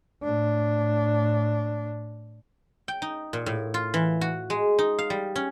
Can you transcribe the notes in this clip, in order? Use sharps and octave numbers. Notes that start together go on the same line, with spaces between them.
A2 D4
G5
D#4
A#2
A2
F4
E3
F#4
G#3
D#4
F5
G3
C#4